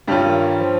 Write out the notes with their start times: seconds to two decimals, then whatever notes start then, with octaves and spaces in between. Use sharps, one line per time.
0.07 G2 C3 G3 C#4 F4
0.25 D#3
0.42 D#3
0.60 F3